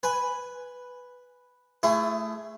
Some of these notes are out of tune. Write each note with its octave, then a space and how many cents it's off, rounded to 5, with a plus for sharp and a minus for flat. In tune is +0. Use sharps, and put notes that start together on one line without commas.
B4 +0 G#5 +0
A3 +0 E4 +30 G#4 +0